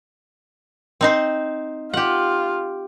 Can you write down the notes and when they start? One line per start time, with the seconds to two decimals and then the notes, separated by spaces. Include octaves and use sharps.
1.01 C4 D#4 C5
1.94 F4 G4 F#5